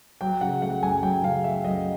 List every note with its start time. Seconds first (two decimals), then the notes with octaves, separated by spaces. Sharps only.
0.21 F#3 G5
0.41 C#3 F#5
0.62 A3 F#5
0.83 F#2 G#5
1.03 F#3 G5
1.24 C#3 F5
1.44 A3 E5
1.65 F#2 D#5